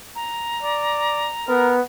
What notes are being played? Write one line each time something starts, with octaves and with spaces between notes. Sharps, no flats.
A#5
D5
B3 A#4